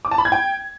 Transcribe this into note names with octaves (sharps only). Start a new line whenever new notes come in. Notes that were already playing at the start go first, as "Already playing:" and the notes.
D6
A5
B5
G#6
G5